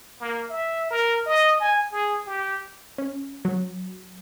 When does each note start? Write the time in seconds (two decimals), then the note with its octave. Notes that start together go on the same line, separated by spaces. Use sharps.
0.21 A#3
0.50 E5
0.91 A#4
1.26 D#5
1.60 G#5
1.92 G#4
2.27 G4
2.98 C#4
3.45 F#3